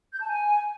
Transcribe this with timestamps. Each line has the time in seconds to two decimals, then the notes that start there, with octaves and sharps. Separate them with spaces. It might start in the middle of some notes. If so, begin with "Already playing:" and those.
0.12 G6
0.20 A5
0.28 G#5